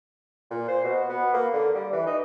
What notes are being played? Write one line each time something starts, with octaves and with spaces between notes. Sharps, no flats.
A#2
C5
B2
B3
A#3
D3
G3
E3
D#4